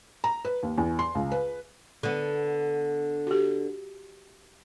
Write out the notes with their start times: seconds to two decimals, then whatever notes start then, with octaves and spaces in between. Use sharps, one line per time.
0.24 A#5
0.45 B4
0.63 D#2
0.78 E2
0.99 C6
1.15 C#2
1.32 B4
2.03 D3 B3
3.27 F#4 G4